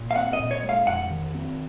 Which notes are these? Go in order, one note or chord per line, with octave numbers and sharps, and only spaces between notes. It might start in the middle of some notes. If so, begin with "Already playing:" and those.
Already playing: A#2
F5
C4 F#5
D#5
A#2
C#5
G#3
F5
F2 F#5
D#3
C4